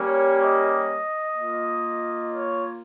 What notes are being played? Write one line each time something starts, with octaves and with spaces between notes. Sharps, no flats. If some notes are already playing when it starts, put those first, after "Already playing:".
Already playing: G3 A#3 C#4 G4 C#5
D#5
A#3 F4
C#5